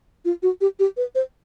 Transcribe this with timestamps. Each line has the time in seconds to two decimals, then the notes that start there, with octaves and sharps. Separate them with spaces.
0.25 F4
0.43 F#4
0.61 G4
0.79 G4
0.97 B4
1.15 C5